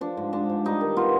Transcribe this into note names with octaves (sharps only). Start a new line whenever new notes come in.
F3 D4
G#2
G#3 D4
G#2
G3 D#4
D#3
B3 F4